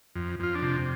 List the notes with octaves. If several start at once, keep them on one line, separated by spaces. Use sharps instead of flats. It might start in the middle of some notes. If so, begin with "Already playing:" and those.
F2
F2 F4
D4
C3